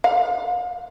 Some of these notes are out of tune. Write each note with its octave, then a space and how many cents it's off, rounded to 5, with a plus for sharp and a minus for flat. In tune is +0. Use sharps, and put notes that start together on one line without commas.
F5 +35